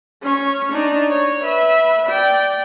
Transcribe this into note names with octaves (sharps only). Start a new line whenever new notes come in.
C#4 C#6
D4 D#4
C#5
B4 E5
D5 G5